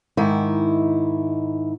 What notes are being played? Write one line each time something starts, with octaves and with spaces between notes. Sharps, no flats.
G#2 D#3 E4